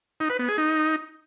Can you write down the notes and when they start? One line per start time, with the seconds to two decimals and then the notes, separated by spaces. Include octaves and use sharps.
0.20 D#4
0.30 B4
0.39 B3
0.48 G#4
0.58 D#4